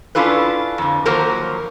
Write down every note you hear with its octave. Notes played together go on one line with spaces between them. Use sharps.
C#4 D4 E4 F4 A4 B4
F2 D3
D#3 F3 F#3 A#3 A#4 C5